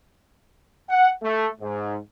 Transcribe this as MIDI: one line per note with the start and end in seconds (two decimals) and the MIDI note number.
0.90 1.10 78
1.22 1.48 57
1.61 1.97 44